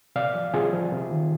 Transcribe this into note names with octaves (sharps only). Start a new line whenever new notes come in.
C3 D5 F5
F3
C3 F4 G#4
F3
C3
D#3